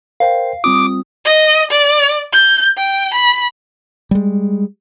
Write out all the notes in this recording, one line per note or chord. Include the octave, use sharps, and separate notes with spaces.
A#4 C5 F5 G5
G3 C4 F4 D6 D#6
D#5
D5
G6
G5
B5
G3 G#3